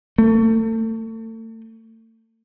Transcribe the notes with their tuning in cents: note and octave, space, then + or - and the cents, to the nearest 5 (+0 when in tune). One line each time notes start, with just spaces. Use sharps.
A3 +35